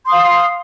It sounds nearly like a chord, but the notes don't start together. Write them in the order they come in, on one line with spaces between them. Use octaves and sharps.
C6 D#6 F5